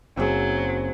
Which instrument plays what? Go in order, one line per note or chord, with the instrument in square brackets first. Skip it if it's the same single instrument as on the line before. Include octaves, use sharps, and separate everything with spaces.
[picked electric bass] F#1 [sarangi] F#3 [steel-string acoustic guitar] C4 G#4 C5